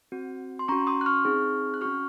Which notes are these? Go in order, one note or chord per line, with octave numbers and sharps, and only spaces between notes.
C4 F#4
C6
C#4 F#4 A#5 C#6
C6 D#6
F#6
C#6 F6
C4 D#4 G#4
F#6
C#4 F#4 C#6 F6